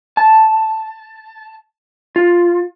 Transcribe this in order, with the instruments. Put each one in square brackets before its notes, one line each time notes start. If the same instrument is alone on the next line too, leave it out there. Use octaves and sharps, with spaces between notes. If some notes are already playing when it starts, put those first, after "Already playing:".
[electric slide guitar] A5
F4